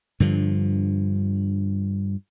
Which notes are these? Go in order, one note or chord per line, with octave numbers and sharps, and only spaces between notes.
G2 D3 F3